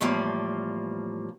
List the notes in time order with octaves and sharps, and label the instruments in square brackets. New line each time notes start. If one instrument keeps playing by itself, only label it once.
[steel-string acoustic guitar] E2 A2 F3 G3 A#3